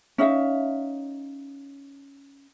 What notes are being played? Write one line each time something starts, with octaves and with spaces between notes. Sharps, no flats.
C#4 D#4 E5 F5